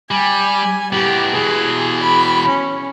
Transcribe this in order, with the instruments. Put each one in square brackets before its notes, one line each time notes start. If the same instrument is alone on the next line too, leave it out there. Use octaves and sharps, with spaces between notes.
[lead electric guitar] G3 [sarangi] G#5
[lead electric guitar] A2 B3 [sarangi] G4
[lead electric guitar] B2 E3 [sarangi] G#4
[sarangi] B5
C#4